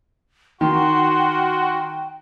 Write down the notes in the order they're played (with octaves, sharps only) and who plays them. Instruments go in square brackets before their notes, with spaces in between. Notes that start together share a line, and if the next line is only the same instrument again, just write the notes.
[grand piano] D#3 [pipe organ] F#4 [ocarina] G5 [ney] C6